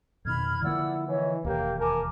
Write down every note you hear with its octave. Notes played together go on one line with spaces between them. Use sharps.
F2 B2 D#3 B5 F6 G#6
D3 F3 A#3 E4 D5 F#5 E6
E3 E4 C#5 D#5
E1 D#2 A#3 G4
A#4 G#5 A5 D6